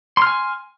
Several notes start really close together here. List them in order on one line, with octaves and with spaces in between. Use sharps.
C6 F6 G#5